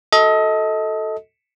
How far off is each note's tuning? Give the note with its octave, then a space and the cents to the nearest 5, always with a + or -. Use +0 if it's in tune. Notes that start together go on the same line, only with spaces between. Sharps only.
F#4 +0 A4 +0 D#5 +30